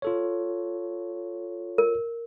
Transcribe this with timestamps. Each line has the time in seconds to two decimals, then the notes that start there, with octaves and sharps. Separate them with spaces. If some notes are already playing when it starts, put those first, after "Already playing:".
0.02 F4 A4 C#5
1.78 A#4